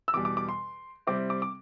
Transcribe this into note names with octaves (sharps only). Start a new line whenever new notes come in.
E6
E2 B2 G3 D6
D6
D6
C6
C3 G3 C4 E4 D6
D6
D6